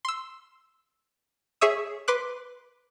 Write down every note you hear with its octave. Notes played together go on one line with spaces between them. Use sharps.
C6 E6
G#4 C#5 E5 D#6
B4 C6 D6 F#6